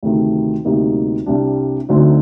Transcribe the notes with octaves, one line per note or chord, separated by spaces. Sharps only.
D2 C3 D#3 A3 D#4
D2 C3 G3 A#3 D#4
C2 C3 G3 D4
D2 D3 F#3 C4 D#4